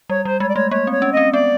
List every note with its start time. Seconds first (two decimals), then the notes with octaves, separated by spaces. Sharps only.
0.09 G3 C#5
0.25 G3 C5
0.40 G#3 C#5
0.49 D5
0.56 A3 C#5
0.71 A#3 C#5
0.87 C4
0.92 C#5
1.02 C#4
1.12 C4 D#5
1.33 B3 D5